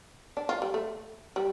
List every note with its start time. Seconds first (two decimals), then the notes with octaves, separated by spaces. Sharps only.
0.37 D4
0.49 F4
0.62 G3
0.74 A3
1.36 G3